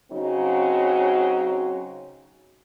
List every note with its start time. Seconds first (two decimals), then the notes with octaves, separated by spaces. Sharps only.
0.11 C#3 F#3 C4 D#4 F#4